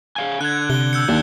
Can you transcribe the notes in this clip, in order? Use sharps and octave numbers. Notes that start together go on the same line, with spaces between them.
G#4 F5 G#5
D3 F#6 G#6
C3 G7
E6 G6 C#7
D#2 D4